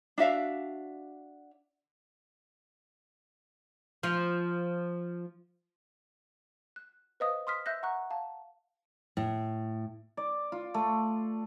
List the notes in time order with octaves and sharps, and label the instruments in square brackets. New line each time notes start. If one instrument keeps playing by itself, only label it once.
[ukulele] D4 F#4 E5 F5
[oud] F3 F4
[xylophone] F#6
B4 C5 D#5 F5 D#6
C6 D#6 F6 B6
E5 E6 F#6 G6 A#6
F#5 A#5 C#6 F#6
F5 A5
[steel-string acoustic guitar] A2
[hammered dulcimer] D5
F4
A3